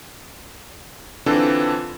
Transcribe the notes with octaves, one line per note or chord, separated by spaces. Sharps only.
D3 E3 C4 D4 F4 A4